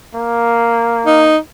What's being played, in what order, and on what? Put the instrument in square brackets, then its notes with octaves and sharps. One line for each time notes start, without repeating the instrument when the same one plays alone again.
[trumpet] A#3
[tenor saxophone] D#4